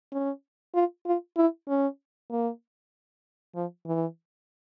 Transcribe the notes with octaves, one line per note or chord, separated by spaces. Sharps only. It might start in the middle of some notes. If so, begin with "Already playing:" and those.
C#4
F4
F4
E4
C#4
A#3
F3
E3